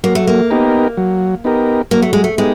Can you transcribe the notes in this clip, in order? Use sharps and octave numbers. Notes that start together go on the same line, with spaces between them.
F#3 A#3
A3
A#3
B3 D#4 G4 A#4
F#3
B3 D#4 G4 A#4
F#3 A#3
A3
G#3
A3
G#3 B3 D#4 G4